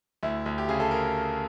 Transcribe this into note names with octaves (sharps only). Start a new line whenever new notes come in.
D2 E4
D2
G4
C#3 G#4
A4
A#4